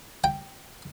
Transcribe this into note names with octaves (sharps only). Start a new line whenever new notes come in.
G5